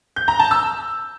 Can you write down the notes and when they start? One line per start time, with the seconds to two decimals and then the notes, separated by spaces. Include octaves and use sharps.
0.16 G6
0.28 A#5
0.39 A5
0.51 E6